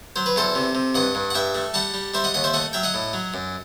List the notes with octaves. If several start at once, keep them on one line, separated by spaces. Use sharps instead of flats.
F#3 C5
B4
E2 A4 C5
C3
C3
G2 D#5 F#5
G2
F#5
G2 E5 G5
A3
G3 F#5 A5
G3
G3 C5 E5
D#5 F#5
D#2 D#5 F#5
C5 E5
A3 D#5 F#5
F#3 E5 G5
D#5 F#5
A2
F#3
F#2